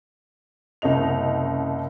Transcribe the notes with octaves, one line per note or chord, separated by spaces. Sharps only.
F#1 C2 C#4 D#5 F7